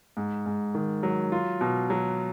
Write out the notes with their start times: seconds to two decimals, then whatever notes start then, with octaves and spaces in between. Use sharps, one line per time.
0.17 G#2
0.46 G#2
0.75 D#3
1.03 F#3
1.32 F4
1.61 B2
1.90 F#3